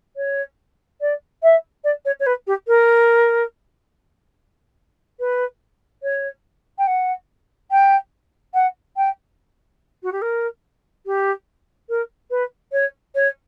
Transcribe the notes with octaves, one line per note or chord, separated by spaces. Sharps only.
C#5
D5
E5
D5
C#5
C#5
B4
G4
A#4
B4
C#5
G5
F#5
G5
F#5
G5
F#4
G4
A#4
G4
A#4
B4
C#5
C#5